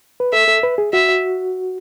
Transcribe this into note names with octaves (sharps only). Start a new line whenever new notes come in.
B4
A4 E5
A4
B4
G#4
F#4 E5